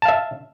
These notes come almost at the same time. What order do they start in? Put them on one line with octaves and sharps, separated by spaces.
A5 F5 E5